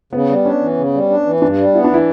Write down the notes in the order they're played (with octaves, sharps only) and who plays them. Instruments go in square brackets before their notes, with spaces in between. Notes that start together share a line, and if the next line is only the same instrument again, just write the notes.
[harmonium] C#3 [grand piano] B3
[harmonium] G3
[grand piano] C#4 [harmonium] D4
[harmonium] E3
C#3
G3
D4
E3
[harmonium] G2 [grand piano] D4
[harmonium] G3
[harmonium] B3 [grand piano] E4
[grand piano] D4
[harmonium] E3 [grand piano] E4